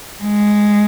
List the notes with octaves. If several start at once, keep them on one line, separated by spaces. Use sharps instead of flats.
G#3